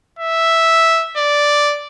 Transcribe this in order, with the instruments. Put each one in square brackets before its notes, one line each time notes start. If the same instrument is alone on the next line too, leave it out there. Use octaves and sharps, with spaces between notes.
[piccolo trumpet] E5
D5